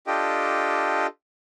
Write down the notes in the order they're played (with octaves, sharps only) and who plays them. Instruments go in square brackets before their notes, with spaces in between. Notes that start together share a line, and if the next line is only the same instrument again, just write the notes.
[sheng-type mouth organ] D4 F4 G4 A4 D#5 G5